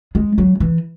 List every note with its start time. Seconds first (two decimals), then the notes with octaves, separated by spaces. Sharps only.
0.15 G#3
0.38 F#3
0.60 E3